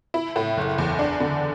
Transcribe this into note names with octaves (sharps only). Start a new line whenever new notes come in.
E4
A2
F#1
E2
D4
D3